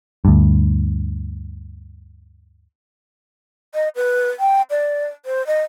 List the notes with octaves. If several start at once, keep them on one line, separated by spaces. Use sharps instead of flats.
D2 G2
D#5
B4
G5
D5
C5
D#5